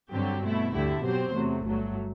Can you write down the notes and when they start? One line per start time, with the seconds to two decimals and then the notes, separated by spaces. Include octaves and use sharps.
0.11 G2 D3 F#3 C4 G4
0.42 B2 A3 E4
0.72 D2 D3 A3 E4 G4
1.02 B2 F#3 C4 G4 C5
1.33 E2 C3 F#3 A3
1.64 G1 G2 F#3 A3